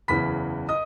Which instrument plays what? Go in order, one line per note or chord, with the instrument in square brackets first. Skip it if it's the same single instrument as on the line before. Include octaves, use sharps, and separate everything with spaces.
[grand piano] F#1 E2 C#3 E3 B5 B6
D#5 D#6